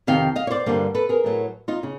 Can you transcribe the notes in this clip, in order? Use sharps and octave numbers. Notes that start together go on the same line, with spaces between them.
F2 C3 D#3 F5 G5
D#5 F5
C#5
C5 D5
G2 D3 G3 A#3
A4 B4
G#4 A#4
A2 F#3 A3
D#4 F4
C#3